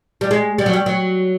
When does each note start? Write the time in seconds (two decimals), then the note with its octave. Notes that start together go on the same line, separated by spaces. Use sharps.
0.21 G3
0.31 G#3
0.58 G3
0.66 F#3
0.73 G3
0.86 F#3